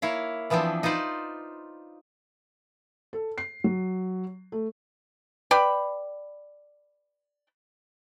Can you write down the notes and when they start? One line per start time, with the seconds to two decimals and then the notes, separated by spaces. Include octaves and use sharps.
0.02 A#3 E4 C#5 F5
0.50 E3 F3 B3 C4 D4
0.83 D#4 F4 B4 C5 D5
3.13 A4
3.38 C7
3.64 F#3
4.52 A3
5.51 B4 D5 G5 B5